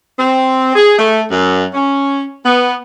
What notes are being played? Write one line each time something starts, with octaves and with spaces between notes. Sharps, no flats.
C4
G#4
A3
F#2
C#4
B3